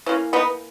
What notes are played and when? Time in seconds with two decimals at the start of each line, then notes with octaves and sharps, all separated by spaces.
0.06 E3 A#3 C#4
0.33 B3 D#4